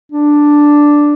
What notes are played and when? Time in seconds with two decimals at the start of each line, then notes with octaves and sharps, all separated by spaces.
0.12 D4